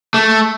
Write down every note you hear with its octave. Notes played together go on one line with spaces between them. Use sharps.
A3